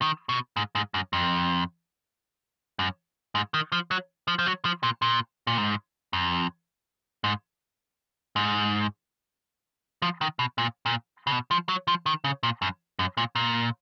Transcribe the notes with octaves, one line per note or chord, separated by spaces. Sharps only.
D#3
B2
G#2
G#2
F#2
F2
F#2
G#2
D#3
F3
F#3
F3
F3
F#3
F3
A#2
A#2
A#2
G#2
F2
G#2
G#2
F3
D#3
B2
A#2
A#2
C#3
B2
F3
F#3
F3
D#3
C#3
A#2
F#2
F#2
A#2
A#2